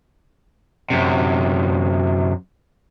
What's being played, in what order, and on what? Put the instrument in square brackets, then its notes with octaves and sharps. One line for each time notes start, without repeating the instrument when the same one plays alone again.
[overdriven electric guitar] F#2 C3